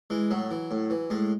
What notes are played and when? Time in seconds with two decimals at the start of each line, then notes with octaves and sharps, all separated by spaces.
0.10 E3 G#3
0.31 A2 F#3
0.51 E3
0.71 A2
0.90 E3
1.10 A2 G#3